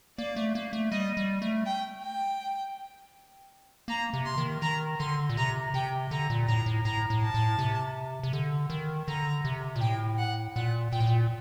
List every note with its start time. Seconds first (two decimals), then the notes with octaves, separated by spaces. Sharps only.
0.18 A#3 D5
0.36 A3
0.55 A#3
0.73 A3
0.91 G3 D#5
1.17 G3
1.42 A3
1.66 G5
2.03 G5
3.88 A#3 A#5
4.13 C3
4.26 C6
4.38 D#3
4.62 D#3 A#5
4.99 D3 C6
5.30 A#2
5.37 C3 A#5
5.74 C3 G5
6.10 D3 A#5
6.30 A#2
6.47 A2 A#5
6.66 A2
6.84 A2 A#5
7.10 A2
7.22 A5
7.34 A2
7.59 C3
8.23 C3
8.33 D3
8.70 D#3
9.08 D3 A#5
9.45 C3
9.76 A#2
9.81 A2 G5
10.19 F#5
10.56 A#2 F#5
10.92 A#2 G5
11.00 A2
11.07 A#2